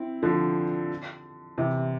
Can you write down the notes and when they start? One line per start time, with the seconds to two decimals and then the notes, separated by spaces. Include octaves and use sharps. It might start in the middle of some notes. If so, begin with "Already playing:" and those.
Already playing: C4 E4
0.23 D3 F3
1.58 C3 E3